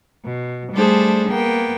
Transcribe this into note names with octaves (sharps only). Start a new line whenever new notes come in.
B2
G3 A3 D4 G#4 A4 C5
A#3 B3 G5